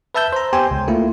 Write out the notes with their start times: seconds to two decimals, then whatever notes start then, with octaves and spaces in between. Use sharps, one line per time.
0.15 B4 E5 A5 E6 G6
0.33 C5 A#5
0.53 B3 G4 C5 G5 G#5
0.71 C#2
0.88 A3 A#3 E4 F4